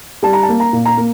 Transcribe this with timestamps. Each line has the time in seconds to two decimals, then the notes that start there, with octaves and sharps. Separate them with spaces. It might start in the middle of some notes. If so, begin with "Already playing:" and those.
0.23 G3 A5
0.33 A#5
0.43 A5
0.49 A#3
0.60 A#5
0.73 A#2
0.85 A#5
0.97 A#3